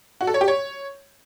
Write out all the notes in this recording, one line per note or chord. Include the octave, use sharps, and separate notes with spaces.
F#4
A4
C#5
G4
C#5